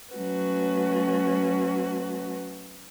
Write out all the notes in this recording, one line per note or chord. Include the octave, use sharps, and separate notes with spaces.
F#3 A3 C#4 F#4 B4